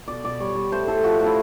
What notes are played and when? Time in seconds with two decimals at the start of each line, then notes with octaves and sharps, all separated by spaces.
0.08 B2 D5
0.25 B2 D5
0.40 G3 C#5
0.55 G3
0.72 A3 C5
0.87 A2 A4
1.03 F3 F#4
1.20 A2
1.26 E4